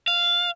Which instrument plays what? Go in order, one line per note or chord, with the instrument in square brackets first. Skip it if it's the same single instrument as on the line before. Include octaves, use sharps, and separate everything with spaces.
[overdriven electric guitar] F5